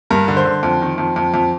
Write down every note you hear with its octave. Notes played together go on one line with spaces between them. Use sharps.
G2 A#4
D3
C5
D3
F2
D#3
F2
F2
F2